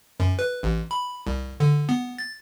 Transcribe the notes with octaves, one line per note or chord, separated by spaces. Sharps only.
F#2
B4
A1
B5
C2
D3
B3
A6